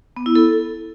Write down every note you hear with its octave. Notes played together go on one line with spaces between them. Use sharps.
B3
E4
A4